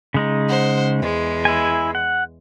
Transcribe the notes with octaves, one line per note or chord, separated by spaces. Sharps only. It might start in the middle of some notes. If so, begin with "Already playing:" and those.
C#3 G#3 D#4
C5 F#5
E2 G#3
E4 G#5
F#5